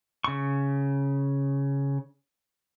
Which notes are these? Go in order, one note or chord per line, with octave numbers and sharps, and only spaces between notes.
C#3 C#6